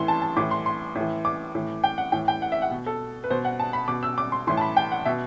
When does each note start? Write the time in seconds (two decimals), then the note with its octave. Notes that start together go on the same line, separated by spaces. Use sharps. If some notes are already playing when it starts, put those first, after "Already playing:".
Already playing: A2 E3 C6
0.08 A5
0.22 A5
0.36 A2 D6
0.40 E3
0.51 C6
0.66 C6
0.95 A2
1.01 E3
1.25 D6
1.55 A2 E3
1.84 G5
1.98 F#5
2.12 A2 E3 G5
2.28 G5
2.42 F#5
2.52 E5
2.62 F#5
2.71 B2
2.86 A4
3.24 B4
3.30 B2 C5
3.45 F#5
3.60 A5
3.73 B5
3.88 B2 D6
4.03 E6
4.18 D6
4.32 C6
4.47 A2 E3 C6
4.57 A5
4.61 B5
4.77 G5
4.92 F#5
5.05 B2 E5